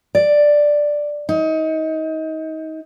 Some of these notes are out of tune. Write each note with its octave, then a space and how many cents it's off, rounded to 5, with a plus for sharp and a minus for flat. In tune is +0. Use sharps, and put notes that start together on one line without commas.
D5 +5
D#4 +30